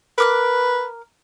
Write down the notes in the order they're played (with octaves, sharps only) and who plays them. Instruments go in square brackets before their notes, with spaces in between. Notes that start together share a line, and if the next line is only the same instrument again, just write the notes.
[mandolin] A#4 D6 F#6 [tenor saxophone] B4